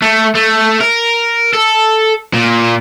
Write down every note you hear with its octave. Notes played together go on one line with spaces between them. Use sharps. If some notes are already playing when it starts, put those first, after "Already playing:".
A3
A3
A#4
A4
A#2